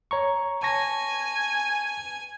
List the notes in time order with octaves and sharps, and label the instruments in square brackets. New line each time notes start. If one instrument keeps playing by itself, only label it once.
[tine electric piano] C#5 A#5 C#6
[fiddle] G#5 [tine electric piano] A5 C#6 A#6